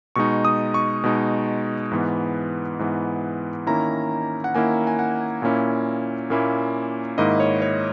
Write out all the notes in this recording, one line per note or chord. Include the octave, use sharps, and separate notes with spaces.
B2 G#3 D#4 C#6
D#6
C#6
B2 G#3 D#4
G#2 E3 B3
G#2 E3 B3
D#3 A#3 C#4 E4 A#5
F#5
D#3 A#3 C#4 E4 G#5
G#5
F#5
A#2 A#3 C#4 E4
A#2 A#3 C#4 E4
G#2 D#3 A#3 E4 D#5
C#5
C#5